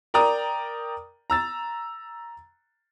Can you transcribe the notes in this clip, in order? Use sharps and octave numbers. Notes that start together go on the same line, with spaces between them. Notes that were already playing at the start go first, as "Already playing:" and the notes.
A#4 D5 G5 A#5 D#6
A#5 E6 A6